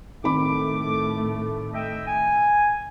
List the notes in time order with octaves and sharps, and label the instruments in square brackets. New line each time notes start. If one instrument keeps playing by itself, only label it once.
[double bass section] A2 A3 [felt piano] D#3 C4 B5 [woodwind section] D6
[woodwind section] D#5 E5 G5
G#5